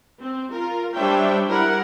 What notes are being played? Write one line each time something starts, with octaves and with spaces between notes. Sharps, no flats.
C4
F4 A#4
G3 D4 C5 C#5 E5 G5
G3 E4 A#4 F#5